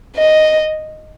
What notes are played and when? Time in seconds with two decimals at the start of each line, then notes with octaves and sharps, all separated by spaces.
0.16 D#5